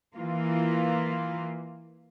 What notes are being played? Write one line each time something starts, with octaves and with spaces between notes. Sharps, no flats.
E3 A#3 F4